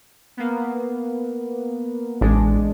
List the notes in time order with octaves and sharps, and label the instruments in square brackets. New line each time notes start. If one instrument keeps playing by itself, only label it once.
[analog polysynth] A#3 B3
[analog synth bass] A1 [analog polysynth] G#3 D4